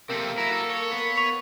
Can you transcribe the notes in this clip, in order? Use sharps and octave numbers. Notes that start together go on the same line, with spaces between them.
C3 A#3 C4 A4
E4 F#4 A#5
A4
C#5
B3
C#6 B6 F7